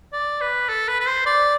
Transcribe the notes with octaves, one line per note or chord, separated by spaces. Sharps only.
D5
B4
A4
B4
B4
C5
D5